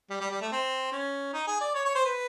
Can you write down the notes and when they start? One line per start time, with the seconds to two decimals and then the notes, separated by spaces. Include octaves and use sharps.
0.11 G3
0.21 G3
0.31 G3
0.41 A3
0.52 C4
0.92 C#4
1.33 D#4
1.47 G#4
1.61 D5
1.75 C#5
1.85 C#5
1.95 C5
2.05 B4